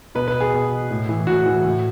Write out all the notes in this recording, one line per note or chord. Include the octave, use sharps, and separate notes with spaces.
B2 B4
B4
G#4
B2
A2
E3
A2 F#4
E3
A2